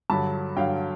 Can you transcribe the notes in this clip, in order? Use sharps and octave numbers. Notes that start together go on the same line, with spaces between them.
G2 D3 F#3 A5 B5
G2 D3 F#3 F5 G5